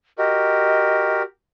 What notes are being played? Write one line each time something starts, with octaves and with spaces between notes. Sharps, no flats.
F#4 G4 A#4 D#5